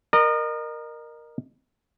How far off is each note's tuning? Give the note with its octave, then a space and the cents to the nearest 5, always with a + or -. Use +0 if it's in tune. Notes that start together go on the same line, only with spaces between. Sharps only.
A#4 +5 D#5 -35